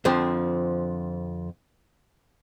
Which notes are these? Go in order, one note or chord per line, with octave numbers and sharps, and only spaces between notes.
F2 D3 F3 C4